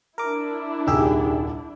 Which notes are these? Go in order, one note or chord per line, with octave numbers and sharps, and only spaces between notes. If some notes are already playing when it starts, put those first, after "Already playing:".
D4 E4 A#4 D6
D#1 C2 D#4 G4 G#4 E6